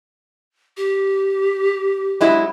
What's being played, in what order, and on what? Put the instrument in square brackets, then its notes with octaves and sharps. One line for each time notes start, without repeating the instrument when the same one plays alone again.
[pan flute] G4
[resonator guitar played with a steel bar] F#3 G#3 E4